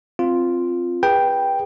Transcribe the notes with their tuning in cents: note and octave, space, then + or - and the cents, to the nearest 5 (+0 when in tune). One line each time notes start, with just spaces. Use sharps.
C4 +0 F4 +0
G#4 -30 B4 -20 G5 +0